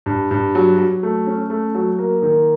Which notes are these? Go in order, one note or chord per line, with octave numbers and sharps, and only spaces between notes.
G2
G2
F#3
F#3
A3
C#4
A3
F#3
A#3
D#3